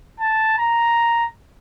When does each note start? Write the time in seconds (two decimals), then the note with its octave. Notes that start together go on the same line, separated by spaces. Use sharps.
0.20 A5
0.58 A#5